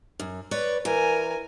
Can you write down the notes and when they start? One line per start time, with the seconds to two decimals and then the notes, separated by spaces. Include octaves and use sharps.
0.20 F#2
0.51 B4 C#5 D5
0.85 E3 A#4 G#5